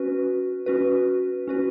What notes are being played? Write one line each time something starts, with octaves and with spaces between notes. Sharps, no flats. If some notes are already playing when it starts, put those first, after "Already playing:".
Already playing: C#4 F#4 B4
C#4 F#4 B4
C#4 F#4 B4